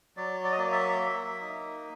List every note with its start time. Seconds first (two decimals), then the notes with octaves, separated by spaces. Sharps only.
0.17 F#3 D5
0.44 D5
0.52 D#5
0.58 A#3 D5
0.72 E5
0.99 A#3
1.41 D#4